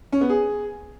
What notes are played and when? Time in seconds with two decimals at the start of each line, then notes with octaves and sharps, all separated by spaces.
0.12 C#4
0.21 B3
0.30 G#4